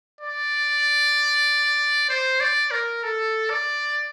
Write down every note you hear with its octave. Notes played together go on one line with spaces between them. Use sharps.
D5
C5
D5
A#4
A4
D5